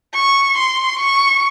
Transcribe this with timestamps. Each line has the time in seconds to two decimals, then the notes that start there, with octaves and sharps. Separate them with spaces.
0.14 C#6
0.57 C6
0.99 C#6